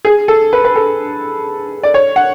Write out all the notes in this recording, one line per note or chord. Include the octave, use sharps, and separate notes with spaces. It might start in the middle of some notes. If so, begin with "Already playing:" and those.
G#4
A4
B4
B4
A4
D5
C#5
F#5